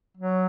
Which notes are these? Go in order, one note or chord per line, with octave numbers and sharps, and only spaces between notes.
F#3